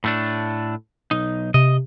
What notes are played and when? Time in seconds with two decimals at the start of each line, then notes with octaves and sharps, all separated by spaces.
0.04 A2 A3 D4
1.11 B1 D#4
1.54 C3 D#5